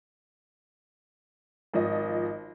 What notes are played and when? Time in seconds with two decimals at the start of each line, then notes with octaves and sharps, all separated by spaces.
1.74 G#1 F3 D#5